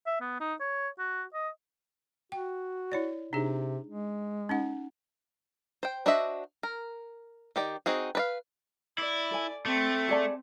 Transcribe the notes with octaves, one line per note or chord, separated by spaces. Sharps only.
E5
B3
D#4
C#5
F#4
D#5
F#4 G5
E4 C#5 D5
C3 D4 D#4 G#4
G#3
C#4 D#4 F#5
C5 G5
D4 F#4 C5 D#5 E5
A#4
D#3 G4 D5
C4 D#4 F#4 G#4
B4 D5 F5
E4 D5
A4 G#5
A3 C4 D6
G#4 D5 A5